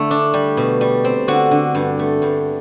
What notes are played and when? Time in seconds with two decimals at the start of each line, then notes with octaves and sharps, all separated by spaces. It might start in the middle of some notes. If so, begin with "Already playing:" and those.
Already playing: D3 A3 E4
0.11 D4
0.34 G3
0.57 B2
0.81 G3
1.05 C4
1.28 D3 F#4 F#5
1.51 D3
1.75 G2
1.99 A3
2.22 G2